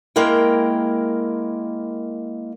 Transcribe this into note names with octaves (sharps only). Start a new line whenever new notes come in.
G#3 A#3 E4 A#4 G5